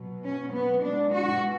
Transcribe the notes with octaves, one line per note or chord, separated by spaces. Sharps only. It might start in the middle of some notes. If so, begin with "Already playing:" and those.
Already playing: B2 F#3
C#4
B3
B2 G#3 D4
F#4